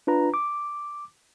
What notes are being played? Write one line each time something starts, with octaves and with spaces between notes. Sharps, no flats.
D4 F4 B4 A#5
D6